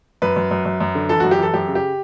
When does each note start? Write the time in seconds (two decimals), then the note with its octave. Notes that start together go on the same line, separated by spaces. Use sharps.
0.22 F#2 B4
0.36 F#2
0.51 F#2
0.66 F#2
0.81 F#2
0.95 D3
1.09 E3 A4
1.20 F#2 F#4
1.31 G4
1.39 E3 A4
1.54 F#2 G4
1.68 C#3
1.75 G4